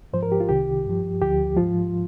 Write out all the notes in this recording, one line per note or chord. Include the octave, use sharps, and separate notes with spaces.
G#2 F3 C5
A#4
G4
F4
C2 C3 D#3 G4
G2 F3
D2 D3 F3 G4
G#2 F3 F4